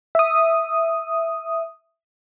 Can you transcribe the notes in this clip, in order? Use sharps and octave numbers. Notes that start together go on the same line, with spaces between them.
E5 D#6